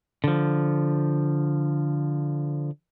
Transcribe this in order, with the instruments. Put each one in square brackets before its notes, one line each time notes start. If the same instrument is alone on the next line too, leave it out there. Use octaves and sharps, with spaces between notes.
[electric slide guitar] D3 F3